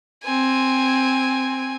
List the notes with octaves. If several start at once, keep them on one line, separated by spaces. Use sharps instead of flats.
C4 G#5